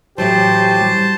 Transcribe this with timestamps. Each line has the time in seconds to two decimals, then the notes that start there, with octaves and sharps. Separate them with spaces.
0.18 A2 E3 F#3 G4 C5 A5 C6
0.81 G3